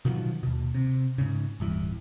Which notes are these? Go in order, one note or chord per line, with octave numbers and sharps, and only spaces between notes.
B2 D#3 F3 F#3
D#2 B2
C3
G#2 C#3
D1 G2 E3